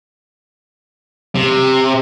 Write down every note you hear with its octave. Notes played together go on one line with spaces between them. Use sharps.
C3